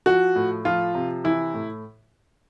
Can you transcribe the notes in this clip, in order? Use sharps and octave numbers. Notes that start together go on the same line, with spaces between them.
F3 F#4
A2
F3 F4
C3
E3 E4
A2